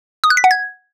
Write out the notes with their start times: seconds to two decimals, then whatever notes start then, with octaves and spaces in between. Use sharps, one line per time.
0.24 D#6
0.30 F#6
0.37 B6
0.44 F#5
0.51 G#6